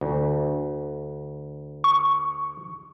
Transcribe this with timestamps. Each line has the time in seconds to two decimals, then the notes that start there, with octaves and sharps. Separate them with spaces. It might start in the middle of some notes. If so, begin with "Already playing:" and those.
0.01 D2
1.84 C#6